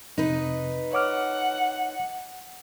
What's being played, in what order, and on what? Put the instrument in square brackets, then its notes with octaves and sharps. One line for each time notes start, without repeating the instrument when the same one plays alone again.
[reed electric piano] F2 C3 [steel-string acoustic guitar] D#4 B4
[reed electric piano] C#5 D6 F6 [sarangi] F#5